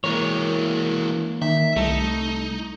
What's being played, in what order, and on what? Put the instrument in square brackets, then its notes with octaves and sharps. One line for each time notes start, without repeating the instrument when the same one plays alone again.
[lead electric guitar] E3 G#3 [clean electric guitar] A#3 A#4 C#5
[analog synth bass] D#3 [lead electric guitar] E5
[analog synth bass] C2 [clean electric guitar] A3 A4 [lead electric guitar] D#4